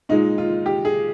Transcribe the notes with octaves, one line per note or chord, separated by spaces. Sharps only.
A#2 G#3 D#4
F4
G4
G#4